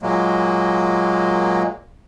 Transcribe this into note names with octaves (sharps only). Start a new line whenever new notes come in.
A#2 F#3 G#3 A#3